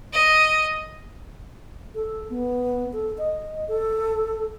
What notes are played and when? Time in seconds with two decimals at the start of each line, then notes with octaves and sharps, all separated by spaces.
0.13 D#5
1.95 A4
2.30 B3
2.93 A4
3.18 D#5
3.68 A4